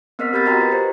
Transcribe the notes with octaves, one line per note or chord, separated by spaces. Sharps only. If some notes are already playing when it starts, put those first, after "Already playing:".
B3 C4 A#4 D#5 F6 B6
G4 A#4 B5 G6 A6 B6
F#4 D#5 G5 A#5
F4 B4
F4 G4 C5